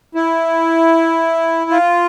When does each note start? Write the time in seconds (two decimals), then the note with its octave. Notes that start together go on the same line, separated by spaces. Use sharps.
0.15 E4
1.71 F4